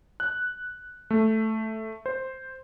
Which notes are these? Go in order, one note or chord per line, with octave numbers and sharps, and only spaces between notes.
F#6
A3
C5